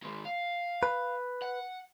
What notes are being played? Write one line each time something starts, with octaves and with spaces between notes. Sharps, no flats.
D#3 G#3
F5
B4
F#5